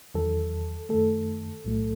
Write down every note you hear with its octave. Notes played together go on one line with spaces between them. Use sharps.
E2 D#3 F#3 A4
F#2 D#3 A3 A4
B1 A2 F#3 A3